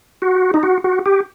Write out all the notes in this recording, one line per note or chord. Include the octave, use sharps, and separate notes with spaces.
F#4
D#4
F#4
F#4
G4